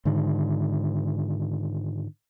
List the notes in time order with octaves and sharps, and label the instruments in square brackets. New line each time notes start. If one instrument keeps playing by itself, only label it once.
[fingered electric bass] G#2 D3 D#3